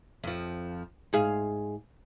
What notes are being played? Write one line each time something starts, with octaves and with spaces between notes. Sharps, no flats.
F2 F3
G#2 G#4 F5